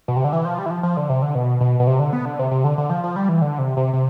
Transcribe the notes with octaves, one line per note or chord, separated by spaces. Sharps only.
B2
C3
D3
E3
F3
G3
E3
F3
F3
D3
C3
D3
B2
B2
B2
C3
D3
B3
D3
C3
C3
D3
D3
F3
F3
G3
E3
D3
C3
C3
C3